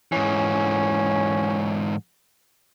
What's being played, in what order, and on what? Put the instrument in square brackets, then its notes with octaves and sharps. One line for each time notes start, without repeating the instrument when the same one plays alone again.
[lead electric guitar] G#2 E3 [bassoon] C#4